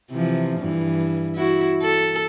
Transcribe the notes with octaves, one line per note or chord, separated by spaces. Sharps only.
C3 E3 F3
G2 E3
E4 F#4
A4